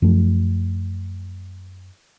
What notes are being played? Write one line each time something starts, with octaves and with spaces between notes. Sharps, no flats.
F#2 F3 A3